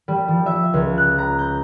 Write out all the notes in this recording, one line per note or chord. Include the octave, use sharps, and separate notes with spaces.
G3
F3
E5
C#2
F#6
A#5
G6